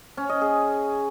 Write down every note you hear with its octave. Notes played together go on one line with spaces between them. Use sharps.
C#4
D#5
G#4